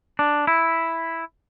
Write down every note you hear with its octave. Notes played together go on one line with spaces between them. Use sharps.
D4
E4